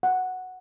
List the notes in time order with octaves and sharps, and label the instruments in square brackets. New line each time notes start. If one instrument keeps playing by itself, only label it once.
[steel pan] F#5